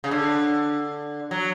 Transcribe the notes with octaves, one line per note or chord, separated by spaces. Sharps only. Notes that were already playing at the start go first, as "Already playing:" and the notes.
C#3
D3
F#3